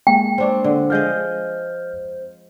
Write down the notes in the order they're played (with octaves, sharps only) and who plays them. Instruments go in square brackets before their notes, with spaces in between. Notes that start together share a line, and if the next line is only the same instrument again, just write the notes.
[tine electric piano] G#3 A#3 [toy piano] G5
[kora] C4 D4 C#5 [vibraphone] C5
[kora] D3
[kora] F3 G#3 D#5 [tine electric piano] F6 G6